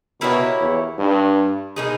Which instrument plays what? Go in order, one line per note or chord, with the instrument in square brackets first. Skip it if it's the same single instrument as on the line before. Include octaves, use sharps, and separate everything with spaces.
[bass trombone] B2 [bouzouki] A#3 E4 G4 C#5
[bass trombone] E2
G2
[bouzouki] B2 A#3 D#4 G#4